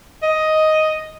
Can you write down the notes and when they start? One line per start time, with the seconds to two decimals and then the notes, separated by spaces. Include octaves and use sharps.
0.22 D#5